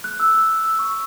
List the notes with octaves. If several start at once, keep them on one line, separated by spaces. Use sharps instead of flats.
F#6
E6
E6
E6
C#6